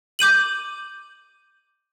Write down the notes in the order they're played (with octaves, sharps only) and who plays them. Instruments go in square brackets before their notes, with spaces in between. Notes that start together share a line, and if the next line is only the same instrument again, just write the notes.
[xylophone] D6 G6 D#7 F#7